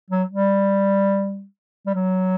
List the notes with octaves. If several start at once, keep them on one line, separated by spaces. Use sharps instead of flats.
F#3
G3
G3
F#3